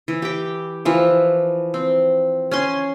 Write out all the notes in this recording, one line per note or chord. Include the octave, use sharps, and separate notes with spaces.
E3
G4 G5
E3 F3
C4
C#4 G#5 C6